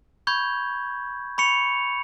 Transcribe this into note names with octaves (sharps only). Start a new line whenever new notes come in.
B5 C#6 G6 G#6
B5 C#6 C#7 F7